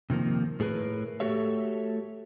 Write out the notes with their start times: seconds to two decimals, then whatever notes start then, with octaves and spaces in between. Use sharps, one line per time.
0.10 C3 D#3 F3 A#3
0.60 A2 G#4 A#4 B4
1.20 A3 F#4 G4 A4 C#5 E5